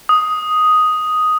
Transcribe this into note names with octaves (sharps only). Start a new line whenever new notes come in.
D#6